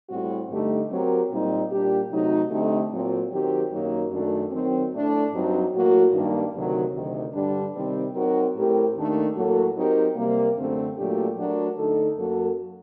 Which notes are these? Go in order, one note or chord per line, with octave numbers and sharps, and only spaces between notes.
A2 G3 C4 F#4
G2 D3 A3 D#4 G4
F#3 C4 G4 A#4
A#2 G3 C4 D#4
A#2 G3 D4 G4
C3 F#3 A3 D#4
D3 A3 C4 D#4 G4
A#2 F#3 C4
D#3 F#3 C4 G4
F#2 D#3 F#3 A#3 D#4
F#2 D#3 A3 D4 F#4
D#3 F#3 C4
A2 A3 D4 A4
G2 F#3 C4 D#4
A2 F#3 A#3 F#4
G2 D#3 G3 A#3 D4
D2 C3 D#3 F#3
D2 C3 D#3
G2 D3 G3 D4 G4
C3 D#3 G3 C4
F#3 C4 D#4 F#4 A#4
A2 A3 C4 G4 A#4
D#2 D#3 A3 D4 A4
A2 F#3 A#3 F#4 A4
F#3 C4 D#4 G4 A#4
C3 G3 A#3
F#2 D3 A3 C4
A#2 F#3 A3 D4 G4
F#3 A3 D4 F#4 A#4
D3 A3 D#4 A4
F#2 F#3 A#3 F#4 A4